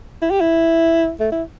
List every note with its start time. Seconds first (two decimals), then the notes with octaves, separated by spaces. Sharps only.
0.22 E4
0.31 G4
0.41 E4
1.20 A3
1.32 E4